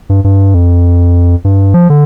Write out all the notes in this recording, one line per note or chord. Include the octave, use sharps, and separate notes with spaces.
G2
G2
F2
G2
F3
D3